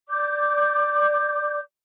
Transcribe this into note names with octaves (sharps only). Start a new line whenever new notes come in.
D5 D6 G6